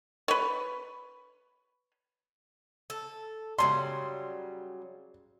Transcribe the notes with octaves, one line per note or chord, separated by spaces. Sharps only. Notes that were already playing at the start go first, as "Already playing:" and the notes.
B4 C#5
A4
C#3 F#3 G3 C6